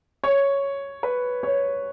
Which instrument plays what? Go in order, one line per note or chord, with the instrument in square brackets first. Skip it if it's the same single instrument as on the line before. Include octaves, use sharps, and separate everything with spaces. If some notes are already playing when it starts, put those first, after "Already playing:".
[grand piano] C#5
B4
C#5